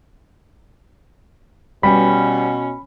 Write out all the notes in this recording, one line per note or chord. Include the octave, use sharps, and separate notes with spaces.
B2 G3 C#4 B5